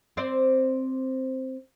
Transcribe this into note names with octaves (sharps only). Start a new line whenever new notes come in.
C4 C5 D5